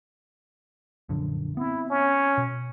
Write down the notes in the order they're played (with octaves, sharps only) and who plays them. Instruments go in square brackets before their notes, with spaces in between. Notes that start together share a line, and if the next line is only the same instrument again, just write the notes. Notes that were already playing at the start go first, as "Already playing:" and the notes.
[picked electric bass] A#1 F#2 D3
[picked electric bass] B3 C4 [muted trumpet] E4
[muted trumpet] C#4
[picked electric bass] B2